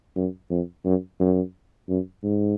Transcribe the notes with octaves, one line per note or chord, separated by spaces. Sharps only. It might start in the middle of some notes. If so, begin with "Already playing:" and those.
F#2
F2
F#2
F#2
F#2
G#2